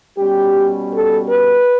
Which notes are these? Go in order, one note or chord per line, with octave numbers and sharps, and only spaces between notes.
B2 G3 C#4 G4
A4
B4